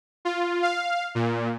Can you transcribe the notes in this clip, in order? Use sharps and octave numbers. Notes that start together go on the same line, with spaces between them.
F4
F5
A#2